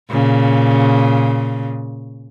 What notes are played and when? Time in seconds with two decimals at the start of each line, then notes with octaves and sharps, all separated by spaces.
0.10 A#2 C#3